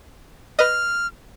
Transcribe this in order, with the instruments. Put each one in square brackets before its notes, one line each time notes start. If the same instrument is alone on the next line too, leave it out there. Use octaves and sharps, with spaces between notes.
[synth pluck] B4 D#5 [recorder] F6